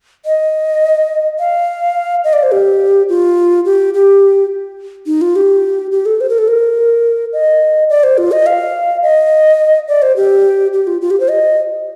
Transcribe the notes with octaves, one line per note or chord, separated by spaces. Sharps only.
D#5
F5
D#5
D5
C5
G4
F4
G4
G4
D#4
F4
G4
G4
A4
C5
A#4
A4
A#4
D#5
D5
C5
F4
D#5
F5
D#5
D5
C5
G4
G4
F4
F4
G4
C5
D#5